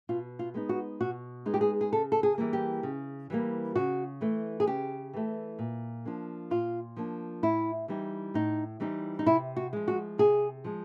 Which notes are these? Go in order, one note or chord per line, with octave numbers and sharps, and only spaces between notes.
B2 F4
F4
G#3 B3 D#4
F#4
B2 F#4
G#3 B3 D#4
G4
G#4
G#4
C#3 A4
A4
G#4
E3 G3 A#3
G4
C#3
E3 G3 A#3
C#3 F#4
E3 A3
G#4
C#3 G4
E3 A3
A#2
F3 A#3 D4
A#2 F4
F3 A#3 D4
A2 E4
E3 G3 C4 D#4
A2 D#4
E3 G3 C4 D#4
D#4
C3 E4
F#4
F3 G#3
F#4
C3 G#4
F3 G#3